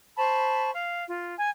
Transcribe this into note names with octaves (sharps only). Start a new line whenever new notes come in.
C5 A5 B5 C#6
F5
F4
G#5